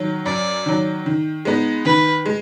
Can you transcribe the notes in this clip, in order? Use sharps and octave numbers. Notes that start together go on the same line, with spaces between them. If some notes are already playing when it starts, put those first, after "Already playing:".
Already playing: D#3 F#3
F#2 D5
D#3 F#3
D#3
G#3 B3 D#4
D#3 B4
G#3